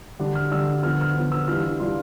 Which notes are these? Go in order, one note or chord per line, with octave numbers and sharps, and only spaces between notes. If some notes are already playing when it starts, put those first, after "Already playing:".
D3 G3 D4
F6
D3 G3 D4 E6
D3 F3 B3 F6
F6
D3 F3 B3
E6
E3 G3 D4 F4 F6
E3 G3 D4 F4 C6